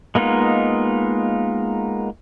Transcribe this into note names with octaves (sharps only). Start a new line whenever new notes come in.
G#3 A#3 B3 D#4 F4